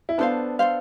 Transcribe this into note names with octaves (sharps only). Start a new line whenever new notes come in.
E4
B3 D4 A4 C5 F5
A4 C5 F5